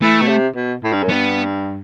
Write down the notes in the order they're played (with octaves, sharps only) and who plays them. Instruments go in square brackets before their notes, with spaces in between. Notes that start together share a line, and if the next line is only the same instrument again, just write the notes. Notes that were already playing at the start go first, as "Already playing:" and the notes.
[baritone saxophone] E3 [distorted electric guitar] A3
[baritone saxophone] B2
C3
B2
A2
G2
F#2
[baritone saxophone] G2 [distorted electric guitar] B3